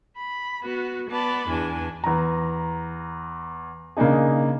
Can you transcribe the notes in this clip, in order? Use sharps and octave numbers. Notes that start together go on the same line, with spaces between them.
B5
B3 F#4
B3 D5 A5 B5
E2 D4 G#5
E2 A#5
C#3 A#3 D4 D#4 G#4